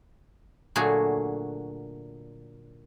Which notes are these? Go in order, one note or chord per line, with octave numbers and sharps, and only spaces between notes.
A#2 D3 F#3 A3 F#4 G#4